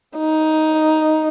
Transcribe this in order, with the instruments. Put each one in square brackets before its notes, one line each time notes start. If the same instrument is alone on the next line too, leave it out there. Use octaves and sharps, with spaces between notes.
[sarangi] D#4